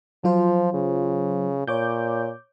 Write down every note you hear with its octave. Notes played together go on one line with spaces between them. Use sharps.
F3 F#3 F4 C5
C#3
A#2 C#5 D6 G6